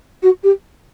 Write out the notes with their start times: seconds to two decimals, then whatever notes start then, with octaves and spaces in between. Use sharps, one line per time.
0.22 F#4
0.43 G4